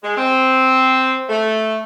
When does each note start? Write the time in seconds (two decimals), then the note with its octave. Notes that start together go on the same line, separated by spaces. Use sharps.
0.03 G#3
0.16 C4
1.29 A3